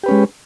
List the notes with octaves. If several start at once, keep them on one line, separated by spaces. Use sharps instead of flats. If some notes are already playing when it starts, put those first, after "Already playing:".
G#3 C#4 G4 B4